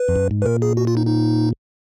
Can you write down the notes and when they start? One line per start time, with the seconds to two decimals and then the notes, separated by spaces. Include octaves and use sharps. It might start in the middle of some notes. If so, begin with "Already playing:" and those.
Already playing: B4
0.08 F2
0.16 F#2
0.31 G#2
0.42 B4
0.46 A#2 A#4
0.62 G#4
0.77 F#4
0.87 F4
0.97 D#4
1.07 D#4